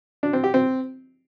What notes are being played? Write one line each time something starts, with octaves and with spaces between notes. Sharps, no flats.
D4
C4
G4
C4